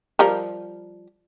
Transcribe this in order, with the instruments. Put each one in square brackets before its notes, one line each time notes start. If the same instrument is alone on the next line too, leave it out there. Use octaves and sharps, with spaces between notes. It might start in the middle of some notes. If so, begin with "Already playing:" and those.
[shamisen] F3 G3 A#4